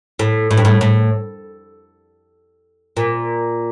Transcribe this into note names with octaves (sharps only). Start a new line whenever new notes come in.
A2
A2
G2
A2
A2
A#2